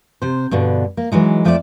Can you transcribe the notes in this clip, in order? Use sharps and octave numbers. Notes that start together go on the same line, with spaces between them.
C3 C5
G2 B2 D3
A#3
E3 F#3 G#3 D#4
F2 F3 A3 C4 F#4 D5